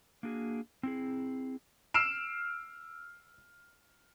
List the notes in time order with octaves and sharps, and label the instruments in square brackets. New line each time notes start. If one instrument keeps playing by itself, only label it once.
[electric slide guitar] A#3 D4 F#4 G#4
C4 E4 G#4
[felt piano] E6 F6 C7 D7 E7